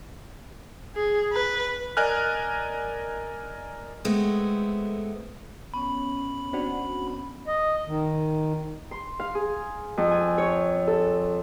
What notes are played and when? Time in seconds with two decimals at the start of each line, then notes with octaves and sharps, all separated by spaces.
0.95 G#4
1.32 B4
1.97 A#4 D5 D#5 G#5 F6 F#6
4.05 G#3 A3 B3 C4
5.74 B3 C#4 C#5 B5
6.53 C4 D4 F#4
7.47 D#5
7.87 D#3
8.91 C6
9.20 F5
9.35 G#4
9.97 F2
10.11 G#5
10.38 C#5
10.87 A4